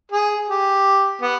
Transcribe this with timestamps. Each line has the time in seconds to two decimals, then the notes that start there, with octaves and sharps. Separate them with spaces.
0.12 G#4
0.48 G4
1.22 B3